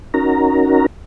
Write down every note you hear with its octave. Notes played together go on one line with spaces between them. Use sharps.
C#4 D#4 F#4 A#4 A#5